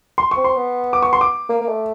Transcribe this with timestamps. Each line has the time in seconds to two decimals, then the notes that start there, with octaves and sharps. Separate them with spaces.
0.18 C6
0.31 C#6
0.36 C4
0.44 C6
0.56 B3
0.93 D6
1.02 C#6
1.13 C6
1.21 D6
1.49 A#3
1.61 A#3
1.68 A3